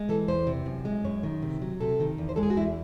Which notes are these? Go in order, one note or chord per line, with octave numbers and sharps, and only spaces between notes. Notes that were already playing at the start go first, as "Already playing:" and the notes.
Already playing: G#3
E3 A4
E2 C5
C3
F#2
G#3
F#2 C#5
D#3
C3
F#3
C3 A4
D#3
E2
C5
G#3 A4
G#4
F#4
E2 E4